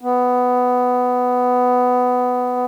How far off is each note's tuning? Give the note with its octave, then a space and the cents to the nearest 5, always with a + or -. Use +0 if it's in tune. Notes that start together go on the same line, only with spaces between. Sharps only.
B3 +10